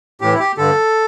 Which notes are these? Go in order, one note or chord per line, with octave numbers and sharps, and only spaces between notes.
A2 E3 G4
E4
G4
G2 D3 A4